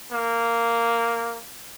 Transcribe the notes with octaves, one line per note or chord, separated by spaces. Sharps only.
A#3